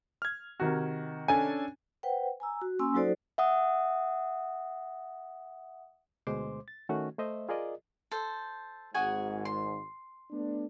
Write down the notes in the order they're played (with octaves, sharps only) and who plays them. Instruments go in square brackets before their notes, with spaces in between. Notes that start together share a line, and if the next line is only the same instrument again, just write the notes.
[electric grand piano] F6 G#6
[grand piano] C3 D#3 F#4
[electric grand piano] C#4 D4 A4 [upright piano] G#5
[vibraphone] B4 C5 F#5 G5
G#5 A#5 E6
F#4
A#3 C#4 G#5 C6 E6
F#3 D#4 F#4 A4 C5 D5
[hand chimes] E5 F#5 D#6
[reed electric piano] D2 B2 G#3 C5 C6 D6
A6
D#3 A3 C#4 F#4
A3 C5 D#5 E5
F4 G#4 A#4 D5 D#5
[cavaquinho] A4 C5
[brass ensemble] G#1 G#2 [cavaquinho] F#4 G#4 G#5
[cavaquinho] C6
[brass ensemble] A3 B3 D4